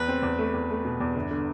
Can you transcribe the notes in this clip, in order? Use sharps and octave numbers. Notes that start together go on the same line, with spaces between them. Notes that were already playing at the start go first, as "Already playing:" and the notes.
Already playing: E2 B4
C4
E2
A3
E2
A3
B2
E2
G1
D3